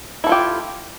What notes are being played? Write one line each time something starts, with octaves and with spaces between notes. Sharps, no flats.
E4 F4 G4 A4